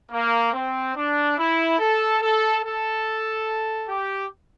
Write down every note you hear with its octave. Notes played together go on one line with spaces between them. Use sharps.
A#3
C4
D4
E4
A4
A4
A4
G4